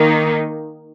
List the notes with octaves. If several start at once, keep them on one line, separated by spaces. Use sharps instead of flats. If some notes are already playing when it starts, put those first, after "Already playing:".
Already playing: D#3 A#3 D#4